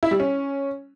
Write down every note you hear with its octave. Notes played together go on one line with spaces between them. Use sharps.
E4
G3
C#4